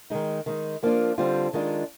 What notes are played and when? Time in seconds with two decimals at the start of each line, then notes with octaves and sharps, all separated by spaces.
0.10 D#3 G#3 D#4
0.46 D#3 G#3 D#4
0.83 F3 A#3 D4 F4
1.18 D3 G3 C4 F4
1.53 D#3 G#3 D4 F4